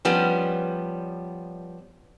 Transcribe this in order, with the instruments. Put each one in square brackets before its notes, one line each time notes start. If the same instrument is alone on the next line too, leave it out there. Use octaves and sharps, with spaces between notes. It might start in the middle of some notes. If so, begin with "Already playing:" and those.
[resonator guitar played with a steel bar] F3 G3 B3 C#4